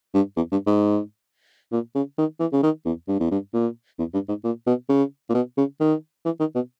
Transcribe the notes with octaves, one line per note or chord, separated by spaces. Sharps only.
G2
E2
G2
G#2
A#2
C#3
D#3
E3
C#3
D#3
E2
G2
E2
G2
A#2
E2
G2
G#2
A#2
B2
C#3
A#2
B2
C#3
D#3
E3
D#3
B2